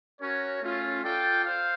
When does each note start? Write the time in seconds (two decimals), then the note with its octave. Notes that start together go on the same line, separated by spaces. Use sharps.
0.20 C#4 F#4 A#4 C#5
0.61 A3 C#4 F4
1.03 F4 A4 D5 G5
1.45 C5 F5